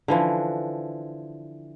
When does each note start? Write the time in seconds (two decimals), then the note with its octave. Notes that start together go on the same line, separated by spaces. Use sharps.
0.08 D3 E3 F3